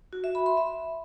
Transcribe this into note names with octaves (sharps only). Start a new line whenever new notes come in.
F#4
E5
B5
C6
E5